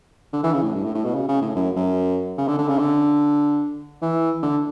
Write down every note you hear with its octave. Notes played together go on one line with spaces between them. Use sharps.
D3
E3
C#3
A2
G2
A2
A2
B2
C#3
C#3
A2
F#2
F#2
C#3
D3
D3
C#3
D3
E3
D3